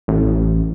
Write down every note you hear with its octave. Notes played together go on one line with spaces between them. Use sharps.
A1